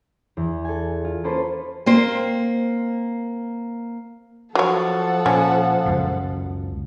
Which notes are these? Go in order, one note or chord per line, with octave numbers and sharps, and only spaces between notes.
E2
A4 G#5
F4
A#3 C#4 A4 B4 C5
A#3 C4 C5
F3 F#3 A4 C#5 F#5
A#2 C#4
C#2 F#2 B2